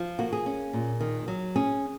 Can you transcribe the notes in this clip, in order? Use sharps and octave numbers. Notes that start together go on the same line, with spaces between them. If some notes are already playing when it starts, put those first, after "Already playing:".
Already playing: F3
A#3 F#4
G#4
C#4
A#2
D#3
F#3
C#4 G#4